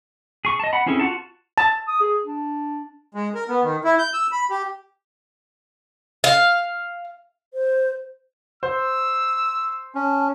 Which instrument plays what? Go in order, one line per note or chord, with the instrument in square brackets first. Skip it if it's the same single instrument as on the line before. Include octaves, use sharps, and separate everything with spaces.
[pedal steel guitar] G#4 C#6
D#5 A5
F#5 B5
C4 C#4 E4 G#4 A4
F4 F#4 F#5 A5
[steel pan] A5
[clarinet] D#6
G#4
D4
[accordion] G#3
A#4
B3
D#3
E4
G6
E6
B5
G4
[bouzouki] F5
[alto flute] C5
[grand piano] C5 [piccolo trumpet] E6
[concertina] C#4 [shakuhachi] A5